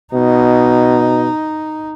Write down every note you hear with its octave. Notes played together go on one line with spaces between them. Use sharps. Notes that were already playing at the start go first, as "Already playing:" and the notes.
B2 D#4